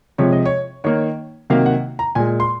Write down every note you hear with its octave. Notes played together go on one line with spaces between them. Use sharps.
C3 F3 G#3 C#5
D#5
C#5
D#3 A#3 C#5
C3 D#3 F#3 A#3 F5
F#5
A#5
A#2 G#3 G#5
C6